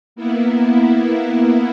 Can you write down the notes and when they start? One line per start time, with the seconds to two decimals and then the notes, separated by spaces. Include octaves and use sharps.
0.16 A#3 B3 E4